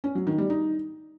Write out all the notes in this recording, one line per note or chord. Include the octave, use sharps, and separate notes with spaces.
C#4
F#3
D#3
G3
D#4